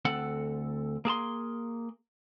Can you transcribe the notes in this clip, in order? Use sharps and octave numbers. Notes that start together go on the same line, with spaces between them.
D2 C4 A4 F#5
A#3 G#4 A5 C6